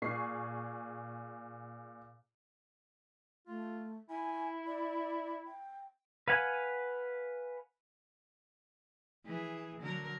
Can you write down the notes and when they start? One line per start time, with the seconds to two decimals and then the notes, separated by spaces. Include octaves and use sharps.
0.02 A#2 G#4 C#6 C7
3.47 A3 F4
4.10 E4 G#5
4.67 D5
5.47 G5
6.28 B4 F5 F#5 G#5
9.25 E3 G#4
9.80 D3 F#3 A#4